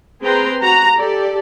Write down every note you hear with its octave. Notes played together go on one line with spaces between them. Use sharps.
C4 G#4 B4 G5 A#5 C6
F#4 F#5 A#5
G4 A4 D5